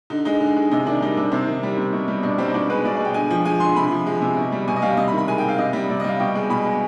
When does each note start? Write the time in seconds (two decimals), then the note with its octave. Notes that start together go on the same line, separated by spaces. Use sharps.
0.10 D3 D#4
0.25 G#3 D#4
0.41 D3
0.57 G#3
0.71 C3 D#4
0.87 D#3 D4
1.02 G3 D#4
1.16 C3 D4
1.32 C3 C4
1.47 D#3
1.63 G3
1.77 C3
1.93 B2
2.08 G3
2.23 B2 D4
2.38 G3 C4
2.48 D#4
2.54 B2 D4
2.70 G#3 B4
2.85 B2 D5
2.95 D5
3.00 G#3
3.05 G5
3.14 D3 G#5
3.30 F3
3.45 G#3 G#5
3.60 D3 C6
3.75 C3 B5
3.92 F3
4.06 G#3
4.22 C3
4.37 B2
4.52 G3
4.68 B2 G#5
4.76 D#5
4.82 G3 F5
4.97 C3 D#5
5.08 B5
5.12 D#3
5.18 B5
5.28 G#3 G#5
5.38 G5
5.44 C3 F5
5.58 C3 D#5
5.73 G3
5.89 C3 D5
6.00 D#5
6.04 G3 F5
6.19 B2 G5
6.35 G#3
6.50 B2 B5
6.66 G#3